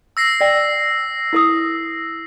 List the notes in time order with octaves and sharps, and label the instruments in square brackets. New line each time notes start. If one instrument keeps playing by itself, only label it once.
[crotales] E6 A#6 C7
[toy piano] D5 G5
E4 A#4 D#6